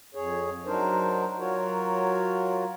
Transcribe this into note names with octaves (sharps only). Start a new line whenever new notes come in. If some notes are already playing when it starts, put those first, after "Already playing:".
F2 G#4 C#5
F#3 D4 D#4 A#4 C5
F#3 F4 F#4 A#4 C#5